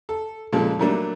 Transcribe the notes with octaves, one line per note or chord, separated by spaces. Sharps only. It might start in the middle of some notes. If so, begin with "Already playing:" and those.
A4
A#2 C#3 F3 G#3 A4
D#3 F#3 G3 A3 A#3 D4